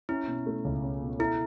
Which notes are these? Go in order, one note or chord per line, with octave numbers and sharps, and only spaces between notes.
C#4 E4
B2
A3
C#2
C#4
B2
E4 A4